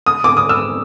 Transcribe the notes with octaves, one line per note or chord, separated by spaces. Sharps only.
D#6
D6
D#6
E6